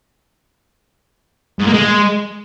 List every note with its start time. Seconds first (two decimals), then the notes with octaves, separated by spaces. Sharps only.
1.59 G#2
1.66 A#3
1.74 G#3